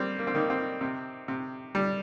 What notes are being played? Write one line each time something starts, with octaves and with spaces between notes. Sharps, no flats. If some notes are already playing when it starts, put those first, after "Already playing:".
Already playing: G3 A#3 C4
A#3
C4
D#3 A#3
C4
C3
C3
G3